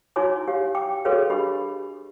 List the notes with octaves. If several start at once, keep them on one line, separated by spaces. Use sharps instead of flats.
D#4 E4 F#4 C#5 G#5 D6
G4 C#5 F5
G5 D6
F#4 G#4 A4 B4 C#5 F5
D4 G4 D#5 B5 D6